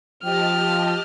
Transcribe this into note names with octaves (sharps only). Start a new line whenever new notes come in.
F3 G4 D#5 G5 A5 F6